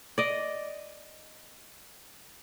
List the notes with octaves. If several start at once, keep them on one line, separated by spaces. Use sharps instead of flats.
D5 D#5